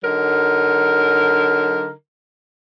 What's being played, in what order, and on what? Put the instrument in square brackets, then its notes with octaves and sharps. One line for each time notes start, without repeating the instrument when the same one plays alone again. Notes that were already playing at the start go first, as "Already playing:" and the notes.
[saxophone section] D3 F#3 D#4 A#4